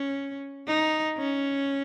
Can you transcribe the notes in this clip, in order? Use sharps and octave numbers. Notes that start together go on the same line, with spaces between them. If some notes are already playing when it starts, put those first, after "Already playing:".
Already playing: C#4
D#4
C#4